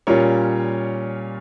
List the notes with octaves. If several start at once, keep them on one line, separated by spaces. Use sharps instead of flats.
A#2 G3 C#4 F4 A#4 C#5